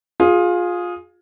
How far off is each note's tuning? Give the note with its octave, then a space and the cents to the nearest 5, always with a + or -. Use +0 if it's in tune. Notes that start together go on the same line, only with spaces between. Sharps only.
F4 +20 G#4 +0